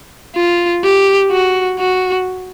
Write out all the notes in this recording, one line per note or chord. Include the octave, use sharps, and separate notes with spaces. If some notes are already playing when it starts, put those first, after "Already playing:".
F4
G4
F#4
F#4